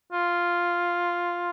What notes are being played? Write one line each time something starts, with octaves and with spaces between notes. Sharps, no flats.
F4